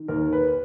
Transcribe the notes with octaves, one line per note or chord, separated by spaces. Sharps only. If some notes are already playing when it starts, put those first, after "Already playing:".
Already playing: D#3
D#2 A#4
B4